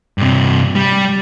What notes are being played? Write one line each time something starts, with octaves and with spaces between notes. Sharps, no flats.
G2 C3
G3